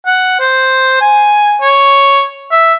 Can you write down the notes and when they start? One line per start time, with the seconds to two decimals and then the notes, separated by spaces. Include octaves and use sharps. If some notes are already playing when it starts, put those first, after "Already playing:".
0.06 F#5
0.40 C5
1.01 G#5
1.62 C#5
2.51 E5